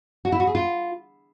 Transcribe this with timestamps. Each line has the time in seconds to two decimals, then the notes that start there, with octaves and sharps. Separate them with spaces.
0.25 F#4
0.32 E4
0.40 F#4
0.47 G#4
0.55 F4